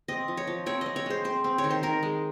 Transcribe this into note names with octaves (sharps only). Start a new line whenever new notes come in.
C4 D#5
F3
C#5
F3
C4 C#5
C4 D#5
C#5
G#3 C5
C4 C5
C4
C#5
D#3
C5
D#3 A#4
G#3